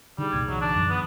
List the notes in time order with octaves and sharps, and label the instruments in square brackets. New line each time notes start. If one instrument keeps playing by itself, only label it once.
[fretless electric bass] D3 [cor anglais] G3 [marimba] D#4 G#4
[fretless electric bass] F1 C2 A#2 [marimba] G#6
[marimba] D3 E3 [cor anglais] F#3
[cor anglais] D4 [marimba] A5 C#6
[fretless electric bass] F#2 F3 F#3
[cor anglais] B3 [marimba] D#6